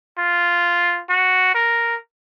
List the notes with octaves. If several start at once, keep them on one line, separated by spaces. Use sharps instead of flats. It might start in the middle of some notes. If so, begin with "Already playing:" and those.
F4
F#4
A#4